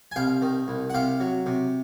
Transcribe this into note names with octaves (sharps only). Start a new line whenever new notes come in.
G#5
C2 F5 G5
D#3
C2
F#5
C3 F5 G5
F#3
C3